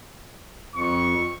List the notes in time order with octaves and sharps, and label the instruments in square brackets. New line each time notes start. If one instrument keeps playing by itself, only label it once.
[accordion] F2 [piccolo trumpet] C#6